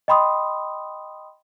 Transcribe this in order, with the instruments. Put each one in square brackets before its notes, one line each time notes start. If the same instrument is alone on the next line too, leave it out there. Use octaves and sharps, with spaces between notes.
[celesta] D#5 G5 B5 C6 D#6